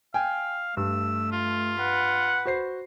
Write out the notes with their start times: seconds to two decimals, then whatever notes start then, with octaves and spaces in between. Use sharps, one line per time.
0.14 F5 G5 G#5
0.77 G2 A3 E6
1.32 F4
1.80 B4 F#5
2.46 F#4 C5 C7